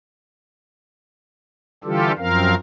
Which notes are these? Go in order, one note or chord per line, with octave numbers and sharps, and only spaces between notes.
D3 E3 G3 F4 G4 A4
F#2 F3 C4 A#4 F5